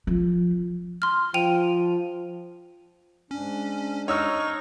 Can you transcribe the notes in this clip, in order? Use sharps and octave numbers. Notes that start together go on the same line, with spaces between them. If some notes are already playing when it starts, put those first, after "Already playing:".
F3
C6 F6
F3 G5 D#7 F7
G#2 C#4 D4
D#4 C#5 C#6 E6 F6